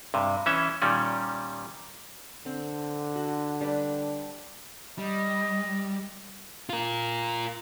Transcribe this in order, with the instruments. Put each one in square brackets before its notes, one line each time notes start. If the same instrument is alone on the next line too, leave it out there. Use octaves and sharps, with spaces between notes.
[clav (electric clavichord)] G2 C3
E3 C#4 E5
A#2 D#3 G3 C#4
[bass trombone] D3 [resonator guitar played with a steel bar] C4
[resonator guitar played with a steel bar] F#4
G3 D4 B4
[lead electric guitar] G3 [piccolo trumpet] D#5
[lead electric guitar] F4 A#4